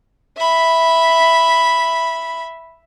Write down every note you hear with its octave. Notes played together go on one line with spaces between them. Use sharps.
E5 B5